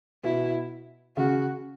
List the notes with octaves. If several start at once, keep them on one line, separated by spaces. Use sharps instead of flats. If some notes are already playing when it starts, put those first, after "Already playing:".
B2 E4
C#3 F#4